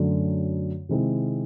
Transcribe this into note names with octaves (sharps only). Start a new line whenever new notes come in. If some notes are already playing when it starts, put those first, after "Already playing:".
Already playing: F#2 D3 F#3 A3
C3 D#3 G#3 C4 E4